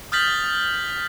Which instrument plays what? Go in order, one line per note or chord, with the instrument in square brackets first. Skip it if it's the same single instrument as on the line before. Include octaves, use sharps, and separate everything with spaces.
[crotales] D#6 F6 G6 A6 B6 F#7